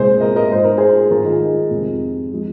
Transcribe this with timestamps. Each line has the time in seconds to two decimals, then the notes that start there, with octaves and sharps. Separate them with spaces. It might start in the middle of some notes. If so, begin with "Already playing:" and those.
Already playing: C2 A#2 G#3 G#4 C5
0.21 A#4 D#5
0.36 A#4 D#5
0.51 G#2 G#3 C5
0.64 A#4
0.77 G#4 C5
1.11 G#2 D#3 G#3 F4 A#4
1.25 D#4 G#4
1.71 F2 C3 G#3
2.32 F3 G#3